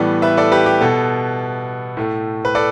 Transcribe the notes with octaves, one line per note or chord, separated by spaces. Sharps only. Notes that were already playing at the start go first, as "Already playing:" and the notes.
Already playing: A2 E3 G3 B3 A4 D5
B4 E5
A4 D5
G4 B4
G4
B2 B3 A4
A2 A3
B4
A4 D5